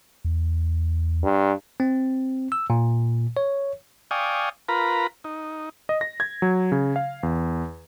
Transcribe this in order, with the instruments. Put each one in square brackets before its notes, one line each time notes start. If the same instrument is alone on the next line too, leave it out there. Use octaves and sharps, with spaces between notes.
[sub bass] E2
[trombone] G2
[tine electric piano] C4
E6
A#2
C#5
[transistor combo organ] D5 F5 G5 G#5 C#6 D#6
F4 A#4 B4 A#5 B5
D#4
[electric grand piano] D#5
A#6
G#6
F#3
C#3
F5
E2